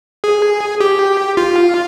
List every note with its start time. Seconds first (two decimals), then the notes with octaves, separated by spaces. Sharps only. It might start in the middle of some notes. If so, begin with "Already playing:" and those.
0.24 G#4
0.80 G4
1.37 F4